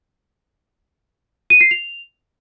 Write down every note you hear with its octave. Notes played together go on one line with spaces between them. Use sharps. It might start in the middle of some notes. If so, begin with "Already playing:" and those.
D#7
C7
F7